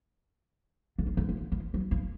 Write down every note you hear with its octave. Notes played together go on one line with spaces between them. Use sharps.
D3
F3
D3
F3
F3
F#3
F3